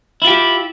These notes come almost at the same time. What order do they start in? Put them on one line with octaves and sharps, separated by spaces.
E4 F4 G4